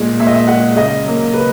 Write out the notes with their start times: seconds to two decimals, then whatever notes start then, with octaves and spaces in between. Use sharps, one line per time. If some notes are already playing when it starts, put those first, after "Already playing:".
Already playing: A#2 G#3
0.20 A#2 E5
0.27 D#5
0.35 E5
0.48 G#3 F#5
0.76 C#3 D#5
1.05 F#3 A#3
1.33 C#3 B4